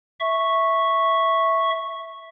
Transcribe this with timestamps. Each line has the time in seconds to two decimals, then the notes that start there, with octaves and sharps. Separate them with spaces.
0.20 E5 C#6